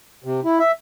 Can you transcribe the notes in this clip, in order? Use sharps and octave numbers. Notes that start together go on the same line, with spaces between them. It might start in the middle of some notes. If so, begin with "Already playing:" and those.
C3
E4
E5